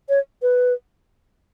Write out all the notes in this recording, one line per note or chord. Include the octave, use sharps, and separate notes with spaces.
C#5
B4